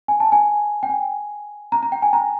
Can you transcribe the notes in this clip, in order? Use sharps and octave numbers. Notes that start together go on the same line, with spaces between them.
G#5
A5
G#5
G5
G#5
A#5
A#5
G5
G#5
A#5